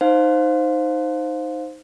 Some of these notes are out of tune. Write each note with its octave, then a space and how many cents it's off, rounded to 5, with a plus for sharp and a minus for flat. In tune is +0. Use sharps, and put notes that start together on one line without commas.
D#4 +0 C5 +0 F5 +20